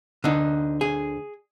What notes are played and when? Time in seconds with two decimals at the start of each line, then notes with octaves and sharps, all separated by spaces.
0.24 D2 D3 D#4
0.81 G#4